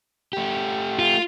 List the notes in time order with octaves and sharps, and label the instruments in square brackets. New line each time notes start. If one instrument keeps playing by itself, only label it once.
[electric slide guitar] A3 G4
[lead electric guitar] F4